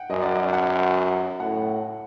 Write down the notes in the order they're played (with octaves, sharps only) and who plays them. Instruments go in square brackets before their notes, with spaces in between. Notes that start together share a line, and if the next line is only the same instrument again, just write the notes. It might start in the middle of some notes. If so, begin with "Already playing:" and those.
Already playing: [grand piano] F#5 G5
[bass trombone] F#2 [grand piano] D#5
[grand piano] D5
D#5
F#5
[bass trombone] A2 [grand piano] F#5